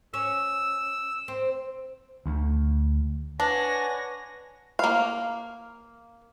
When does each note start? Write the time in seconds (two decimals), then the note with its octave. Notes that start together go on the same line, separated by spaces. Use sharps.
0.14 C#4 E6
1.28 C4
2.26 D2
3.40 D4 B4 C#5 F#5 G#5 A#6
4.79 A#3 F5